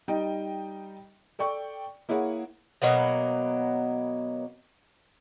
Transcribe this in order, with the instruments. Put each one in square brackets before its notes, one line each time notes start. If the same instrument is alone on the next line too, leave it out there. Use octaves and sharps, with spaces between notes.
[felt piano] G3 D#4 D#5 G5
A4 D5 G5 C#6
A#3 E4 G#4 C#5 F#5
[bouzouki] B2 F#3 A#3 B3